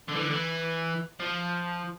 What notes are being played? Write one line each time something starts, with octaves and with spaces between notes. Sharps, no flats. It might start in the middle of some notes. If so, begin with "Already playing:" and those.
D3
E3
D3
E3
F3